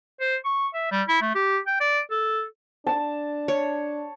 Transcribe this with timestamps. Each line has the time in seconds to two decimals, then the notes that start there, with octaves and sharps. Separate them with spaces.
0.20 C5
0.45 C#6
0.74 E5
0.92 G3
1.08 E4
1.22 A3
1.35 G4
1.67 G5
1.80 D5
2.11 A4
2.87 D4 A5
3.48 C#5